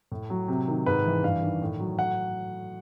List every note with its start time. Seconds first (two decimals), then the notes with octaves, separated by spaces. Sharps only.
0.11 A2
0.30 F#3
0.48 C3
0.68 D#3
0.86 G#2 B4
1.05 E3
1.23 G2 F5
1.42 D#3
1.62 A2
1.80 F#3
1.99 F#5